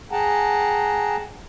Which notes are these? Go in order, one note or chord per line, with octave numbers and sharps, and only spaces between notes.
G#4 F#5 G5 A5 A#5